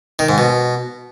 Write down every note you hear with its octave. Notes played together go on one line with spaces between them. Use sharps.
D#3
G#2
B2